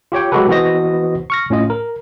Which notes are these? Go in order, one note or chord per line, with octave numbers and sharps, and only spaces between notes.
F4 G4 C#5 G5
F#3 G#3 F#4 G4 A4 B4
E3 B3 F#4 C5 D#5 A#6
C#6 F6 A#6
A2 C#4 F4 D#5
A#4